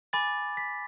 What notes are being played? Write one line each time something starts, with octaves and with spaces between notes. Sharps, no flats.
G#5 B5 D6 A6
B6